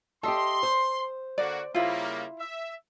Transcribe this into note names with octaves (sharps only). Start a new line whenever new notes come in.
G4 A4 D#5 E5 C6
C5
D3 A#3 F#4 D5
C#3 G3 A#3 E4 F4
E5